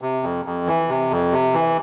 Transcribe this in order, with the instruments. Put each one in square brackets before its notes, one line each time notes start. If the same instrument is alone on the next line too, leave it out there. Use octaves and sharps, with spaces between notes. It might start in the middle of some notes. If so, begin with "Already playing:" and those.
[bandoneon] C3
F2
F2
E3
C3
F2
C3
E3